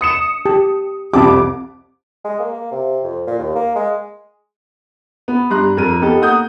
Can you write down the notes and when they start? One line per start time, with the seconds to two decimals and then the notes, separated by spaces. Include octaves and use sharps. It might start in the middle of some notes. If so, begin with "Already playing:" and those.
0.01 D#6 C#7 E7
0.46 G4 A5
1.13 C2 F2 G4 A5 B5 D6
2.25 G#3
2.39 A#3
2.54 A#3
2.72 C3
3.04 F2
3.27 A#2
3.39 D#2
3.55 A#3
3.76 G#3
5.28 B3
5.50 G2 A#5 C6 F#6
5.77 F2 A#4 D#7
6.02 B3 D#4 G4 A4
6.22 A#3 F#5 A#5 D#6 G6